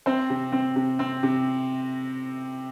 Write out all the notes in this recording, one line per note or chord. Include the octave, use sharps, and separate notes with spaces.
C4 C5
C3
C4
C3
C4
C3